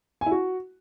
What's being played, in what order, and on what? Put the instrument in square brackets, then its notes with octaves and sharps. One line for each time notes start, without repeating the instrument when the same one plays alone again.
[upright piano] G#5
E4
F#4